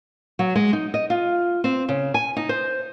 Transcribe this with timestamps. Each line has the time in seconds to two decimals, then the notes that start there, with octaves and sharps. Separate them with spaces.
0.39 F#3
0.55 G#3
0.73 D#4
0.94 D#5
1.10 F4
1.64 C4
1.89 C#3
2.14 G#5
2.37 D#4
2.49 C5